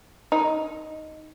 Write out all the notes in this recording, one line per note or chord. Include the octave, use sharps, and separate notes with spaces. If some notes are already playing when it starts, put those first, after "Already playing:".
D#4